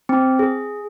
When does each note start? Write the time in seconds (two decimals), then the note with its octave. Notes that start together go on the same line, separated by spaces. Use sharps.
0.09 C4
0.39 G#4